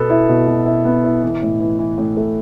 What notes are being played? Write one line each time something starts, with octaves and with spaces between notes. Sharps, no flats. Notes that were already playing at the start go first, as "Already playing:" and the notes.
Already playing: B2 B3 A4
E4
B2
B2
E4
B3
E4
E3
A2
E3
E3
A2
A3